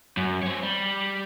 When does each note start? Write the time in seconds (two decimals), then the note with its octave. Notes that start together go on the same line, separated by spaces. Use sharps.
0.17 F#2
0.43 C4 C#5
0.63 G3